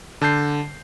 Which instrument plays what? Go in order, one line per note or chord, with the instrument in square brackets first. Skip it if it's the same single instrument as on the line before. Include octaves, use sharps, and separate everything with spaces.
[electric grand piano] D3 A5 G6 C7